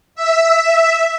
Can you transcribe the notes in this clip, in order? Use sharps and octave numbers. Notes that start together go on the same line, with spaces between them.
E5